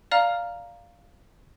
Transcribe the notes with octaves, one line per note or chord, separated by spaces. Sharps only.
D5 F5 A#5 F6